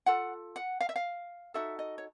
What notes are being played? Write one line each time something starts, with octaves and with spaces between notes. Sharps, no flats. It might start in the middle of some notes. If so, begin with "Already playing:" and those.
F4 A4 F#5
F#5
F5
E5
F5
D#4 F#4 A4 E5
D#5
C#5